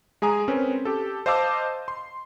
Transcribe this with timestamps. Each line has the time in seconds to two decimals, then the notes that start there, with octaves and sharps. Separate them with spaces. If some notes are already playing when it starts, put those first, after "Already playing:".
0.22 G#3 G#4 G#5 A#5 D#6
0.48 C4 C#4 A#4 B4
0.85 G4 A4
1.26 C5 D#5 F5 A5 D6 E6
1.88 C6